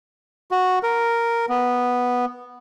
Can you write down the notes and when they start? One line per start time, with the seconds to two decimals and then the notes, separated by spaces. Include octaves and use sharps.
0.51 F#4
0.83 A#4
1.49 B3